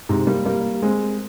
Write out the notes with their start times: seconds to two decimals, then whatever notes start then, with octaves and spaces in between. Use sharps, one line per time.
0.09 G#2 C3
0.27 G3 A#3
0.45 G3 A#3
0.82 G#3 C4